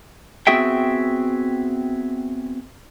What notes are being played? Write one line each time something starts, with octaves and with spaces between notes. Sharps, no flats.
B3 C4 F#4 G#4 E5 G5